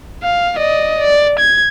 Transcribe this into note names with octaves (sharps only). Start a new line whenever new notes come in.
F5
D5 D#5
D5
G#6